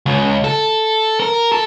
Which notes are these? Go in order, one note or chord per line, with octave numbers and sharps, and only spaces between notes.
C#2
A4
A#4
A4